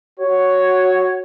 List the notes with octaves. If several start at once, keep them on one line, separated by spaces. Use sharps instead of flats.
F#4 C#5